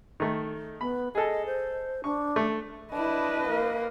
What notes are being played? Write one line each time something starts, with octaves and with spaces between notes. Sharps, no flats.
D#3 A3
B3 B5
G#4 A4 D#5
C5
D4 C#6
A3
D4 E4 B4 D#5
A#3